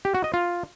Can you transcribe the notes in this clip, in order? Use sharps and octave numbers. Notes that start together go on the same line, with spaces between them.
G4
F#4
D#5
F4